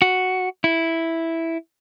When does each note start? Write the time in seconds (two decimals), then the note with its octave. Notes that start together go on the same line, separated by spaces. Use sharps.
0.02 F#4
0.64 E4